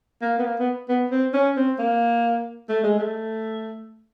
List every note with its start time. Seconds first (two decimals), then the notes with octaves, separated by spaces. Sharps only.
0.22 A#3
0.39 B3
0.44 A#3
0.59 B3
0.89 B3
1.11 C4
1.34 C#4
1.57 C4
1.79 A#3
2.69 A3
2.84 G#3
2.99 A3